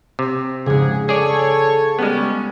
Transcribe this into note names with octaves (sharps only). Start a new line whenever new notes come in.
C3
F2 G#2 C#3 G#4
G#4 A4 C#5 D5
G3 G#3 B3 C#4